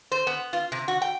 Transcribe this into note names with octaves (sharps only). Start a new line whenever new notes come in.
C5
B3
F4
C3
F#4
G5